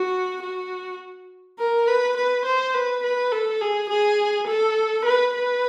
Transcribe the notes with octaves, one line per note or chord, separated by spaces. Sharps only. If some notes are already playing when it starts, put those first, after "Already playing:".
Already playing: F#4
F#4
A#4
B4
B4
C5
B4
B4
A4
G#4
G#4
A4
B4
B4